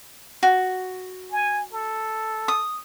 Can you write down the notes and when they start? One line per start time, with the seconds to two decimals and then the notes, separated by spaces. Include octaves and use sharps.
0.43 F#4
1.31 G#5
1.73 A4
2.48 D#6